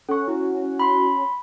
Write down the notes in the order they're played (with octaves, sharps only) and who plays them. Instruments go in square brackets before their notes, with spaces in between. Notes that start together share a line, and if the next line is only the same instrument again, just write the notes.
[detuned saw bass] C#4 [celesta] A4 C#6 [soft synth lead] F#5
[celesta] E4 [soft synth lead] F#4
[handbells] B5 C6